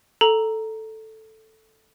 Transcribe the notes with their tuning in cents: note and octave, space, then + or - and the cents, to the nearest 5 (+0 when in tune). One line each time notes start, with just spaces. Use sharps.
A4 +0 A#5 +0